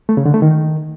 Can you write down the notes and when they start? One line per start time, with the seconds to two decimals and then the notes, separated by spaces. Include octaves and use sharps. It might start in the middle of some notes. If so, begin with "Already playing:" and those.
0.09 A3
0.17 C#3
0.25 D3
0.34 A3
0.42 D#3